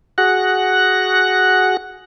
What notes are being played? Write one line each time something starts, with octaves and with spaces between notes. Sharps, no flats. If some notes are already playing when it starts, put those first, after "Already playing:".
F#4 G#4 F#5 F#6 A#6